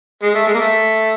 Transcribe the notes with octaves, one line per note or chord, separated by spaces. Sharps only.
G#3
A3
G#3
A#3
A3